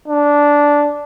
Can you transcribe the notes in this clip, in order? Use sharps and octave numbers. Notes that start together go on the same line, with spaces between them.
D4